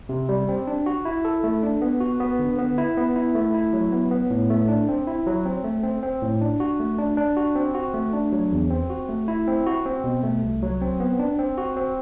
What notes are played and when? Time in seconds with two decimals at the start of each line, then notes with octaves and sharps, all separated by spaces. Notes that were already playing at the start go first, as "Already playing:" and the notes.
0.09 C3
0.29 G3
0.49 C4
0.67 D4
0.86 F#4
1.05 E4
1.25 A4
1.44 A3
1.63 D4
1.82 B3
2.01 F#4
2.20 B3
2.39 D3
2.58 B3
2.78 E4
2.97 B3
3.16 E4
3.35 A3
3.54 E4
3.73 F#3
3.92 B3
4.11 B3
4.30 A2
4.50 A3
4.68 D4
4.89 C4
5.07 E4
5.27 F#3
5.46 C4
5.64 A3
5.83 C4
6.03 C4
6.22 A2
6.41 D4
6.60 F#4
6.80 A3
6.98 D4
7.17 D4
7.37 F#4
7.56 C4
7.74 F#4
7.94 A3
8.13 D4
8.32 F#3
8.52 E2
8.70 C4
8.90 F#4
9.09 A3
9.28 E4
9.47 C4
9.67 F#4
9.86 C4
10.04 B2
10.23 A3
10.43 C2
10.62 F#3
10.81 C4
11.00 B3
11.19 D4
11.39 C4
11.58 F#4
11.76 C4